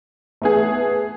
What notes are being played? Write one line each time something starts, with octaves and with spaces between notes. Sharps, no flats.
A3 B3 G#4